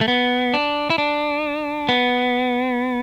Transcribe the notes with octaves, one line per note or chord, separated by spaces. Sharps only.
A3
B3
D4
E4
D4
B3